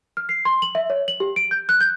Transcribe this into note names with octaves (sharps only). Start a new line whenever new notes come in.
F6
C7
C6
F#7
E5
C#5
F#7
G4
D7
G6
F#6
G6